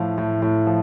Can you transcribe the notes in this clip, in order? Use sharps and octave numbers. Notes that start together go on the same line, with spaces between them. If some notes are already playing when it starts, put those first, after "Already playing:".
Already playing: A2 F3 F5
A2
A2
F3